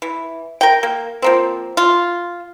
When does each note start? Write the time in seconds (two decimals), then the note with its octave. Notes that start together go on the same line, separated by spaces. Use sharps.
0.02 E3
0.61 A#4 G5
0.83 A#3
1.22 F3 A#3 C4
1.77 F4